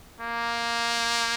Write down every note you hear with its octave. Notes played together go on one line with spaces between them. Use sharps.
A#3